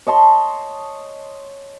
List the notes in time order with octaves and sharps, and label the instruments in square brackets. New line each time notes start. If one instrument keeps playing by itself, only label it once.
[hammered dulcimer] C#5 D#5 A5 C6